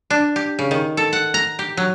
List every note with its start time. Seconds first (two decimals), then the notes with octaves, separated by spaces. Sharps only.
0.10 D4
0.36 G4
0.59 C#3
0.71 D#3
0.97 A4
1.13 F#5
1.34 A#5
1.59 G4
1.77 F#3